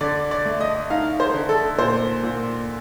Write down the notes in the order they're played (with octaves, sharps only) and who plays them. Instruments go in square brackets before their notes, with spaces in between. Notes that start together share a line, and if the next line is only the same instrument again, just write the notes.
[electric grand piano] D3 [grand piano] D5
[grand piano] D5
[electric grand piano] A3
[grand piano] D#5
[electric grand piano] D#4 [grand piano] F5
[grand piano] C5
[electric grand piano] D3
[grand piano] A4
[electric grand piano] A#2 [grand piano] C5
[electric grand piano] A#2